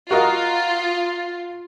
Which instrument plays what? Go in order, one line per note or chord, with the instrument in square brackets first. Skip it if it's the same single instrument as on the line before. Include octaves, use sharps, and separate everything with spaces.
[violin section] F4 [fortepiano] F#4 A#4 D#5